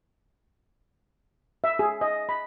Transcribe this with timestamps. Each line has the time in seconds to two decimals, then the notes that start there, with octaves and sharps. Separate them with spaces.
1.64 E5
1.79 G#4
2.01 D#5
2.29 B5